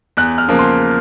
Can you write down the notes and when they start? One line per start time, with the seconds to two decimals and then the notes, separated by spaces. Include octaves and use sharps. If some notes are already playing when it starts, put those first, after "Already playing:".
0.17 E2 F#6
0.38 F6
0.48 C#3 F3 A#3
0.59 C6